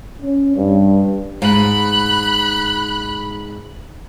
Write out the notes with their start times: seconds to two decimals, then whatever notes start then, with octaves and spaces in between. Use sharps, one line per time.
0.22 C#4
0.56 G2
1.42 G#2 B5 F#6